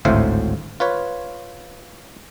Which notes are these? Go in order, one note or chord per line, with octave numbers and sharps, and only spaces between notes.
G#1 D2 A2 C5 E5 F5
F4 B4 C#5